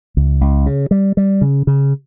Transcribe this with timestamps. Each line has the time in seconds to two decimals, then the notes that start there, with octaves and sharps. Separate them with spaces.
0.17 C#2
0.41 C#2
0.66 C#3
0.91 G3
1.17 G3
1.41 C#3
1.67 C#3